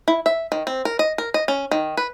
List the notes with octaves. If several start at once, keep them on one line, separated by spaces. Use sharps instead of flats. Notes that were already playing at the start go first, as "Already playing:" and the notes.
E4
E5
D#3
C4
A#4
D#5
A#4
D#5
C#4
D#3
B4